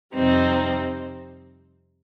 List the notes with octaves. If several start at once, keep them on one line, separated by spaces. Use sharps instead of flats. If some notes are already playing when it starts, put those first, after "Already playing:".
F2 C3 G3 C4 D#4